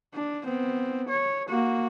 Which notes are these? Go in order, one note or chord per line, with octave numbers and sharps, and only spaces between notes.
D4
B3 C4
C#5
A#3 F#4